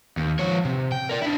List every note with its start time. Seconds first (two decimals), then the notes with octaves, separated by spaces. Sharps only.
0.17 D#2
0.39 F3 C#5
0.65 C3
0.92 G5
1.09 A#4 D5
1.21 D4 E4